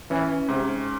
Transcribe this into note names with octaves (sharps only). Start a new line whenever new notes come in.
E3 C#4
G#2 C3